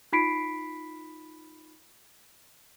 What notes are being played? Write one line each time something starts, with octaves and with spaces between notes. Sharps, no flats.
D#4 F4 B5 B6 C7 D7